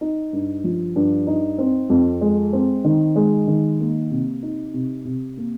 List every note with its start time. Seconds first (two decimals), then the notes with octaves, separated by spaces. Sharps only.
0.01 D#4
0.33 G2
0.64 F3
0.96 G2
1.27 D#4
1.58 C4
1.90 F2
2.21 G#3
2.53 C4
2.84 D#3
3.16 G#3
3.47 D#3
3.80 A#3
4.11 C3
4.43 D#4
4.74 C3
5.05 C3
5.37 A#3